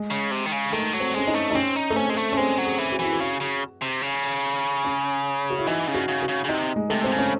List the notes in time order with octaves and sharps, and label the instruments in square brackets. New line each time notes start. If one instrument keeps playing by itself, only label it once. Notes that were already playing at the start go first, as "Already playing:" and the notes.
Already playing: [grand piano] G#3
[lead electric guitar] C#3
C3
D#3
C#3
[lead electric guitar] D#3 [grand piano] A3
[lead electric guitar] F#3
[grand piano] C4
[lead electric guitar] G#3 [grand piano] C#4
[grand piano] D#4
[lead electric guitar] A3
[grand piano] D#4
[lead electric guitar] C4 [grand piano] C#4
[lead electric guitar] D#4
[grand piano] A3
[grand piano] C4 [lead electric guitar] C#4
[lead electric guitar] G#3
A3
[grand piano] C#4
[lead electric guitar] G#3 [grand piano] C4
[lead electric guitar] F#3
[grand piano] G#4
[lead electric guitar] E3
[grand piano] F#4
[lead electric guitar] E3 [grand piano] E4
[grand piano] F#4
[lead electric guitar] C#3
C#3
C3
C#3
[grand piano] C#4
F#4
E4
[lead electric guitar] E3 [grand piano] D#4
[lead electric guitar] C#3
[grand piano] F#4
[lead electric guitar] C#3
[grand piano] F#4
[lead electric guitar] C#3
C#3
[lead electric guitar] C3 [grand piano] D#4
[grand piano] G#3
[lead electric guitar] C3 [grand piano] A3
[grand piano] C4
[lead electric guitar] C#3
[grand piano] C#4